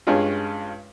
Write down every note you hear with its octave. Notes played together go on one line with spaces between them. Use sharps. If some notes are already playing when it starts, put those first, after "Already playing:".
G2 G#3 C#4 F4